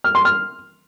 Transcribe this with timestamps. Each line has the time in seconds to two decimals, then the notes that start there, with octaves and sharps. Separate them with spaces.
0.04 F6
0.15 C6
0.25 F6